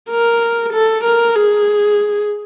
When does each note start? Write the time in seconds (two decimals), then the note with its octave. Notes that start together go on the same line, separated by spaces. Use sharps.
0.10 A#4
0.73 A4
1.05 A#4
1.36 G#4